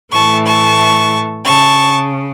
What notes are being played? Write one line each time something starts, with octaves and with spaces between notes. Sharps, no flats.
A2 E3 A3 A5 C#6
A5 C#6
C#3 A5 C#6